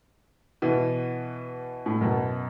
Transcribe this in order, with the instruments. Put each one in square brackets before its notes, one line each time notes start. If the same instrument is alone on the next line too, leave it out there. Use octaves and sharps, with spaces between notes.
[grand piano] B2 E3
A2
F#2 B2